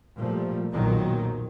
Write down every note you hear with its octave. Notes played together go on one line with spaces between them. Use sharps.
A#2 F3 G3 A3
B1 F2 A#2 D#3 F#3